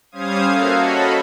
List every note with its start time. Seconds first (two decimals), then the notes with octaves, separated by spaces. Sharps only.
0.12 G3 C#4 C5 F5 D#6 G#6
0.46 A#3 F#4 A4 E5 F5
0.76 F#4 A4 C#5 D#5 B5